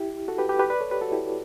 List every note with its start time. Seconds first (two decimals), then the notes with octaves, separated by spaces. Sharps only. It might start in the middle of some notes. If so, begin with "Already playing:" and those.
Already playing: E4 G4
0.28 F#4 A4
0.38 G4 B4
0.49 G4 B4
0.59 G4 B4
0.70 B4 D5
0.81 A4 C#5
0.91 G4 B4
1.01 F#4 A4
1.12 E4 G4